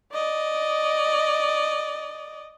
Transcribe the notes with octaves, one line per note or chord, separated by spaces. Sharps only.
D5 D#5